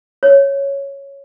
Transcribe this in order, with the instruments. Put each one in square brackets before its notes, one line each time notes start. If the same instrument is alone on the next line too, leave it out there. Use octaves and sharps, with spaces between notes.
[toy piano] C#5